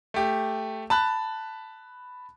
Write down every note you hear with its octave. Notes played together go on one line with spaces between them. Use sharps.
A3 G4
A5 B5 F#6